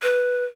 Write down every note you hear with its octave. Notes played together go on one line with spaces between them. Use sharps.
B4